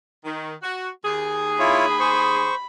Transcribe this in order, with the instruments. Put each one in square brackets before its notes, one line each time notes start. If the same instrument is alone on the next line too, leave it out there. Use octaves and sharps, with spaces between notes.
[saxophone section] D#3
F#4
D#2 G#4
[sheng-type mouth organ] E4 F4 C#5 [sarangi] B5
[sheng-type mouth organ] C5 C#6